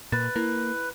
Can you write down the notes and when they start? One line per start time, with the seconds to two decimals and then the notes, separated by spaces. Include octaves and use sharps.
0.12 A#2 B4 A6
0.36 A#3 E4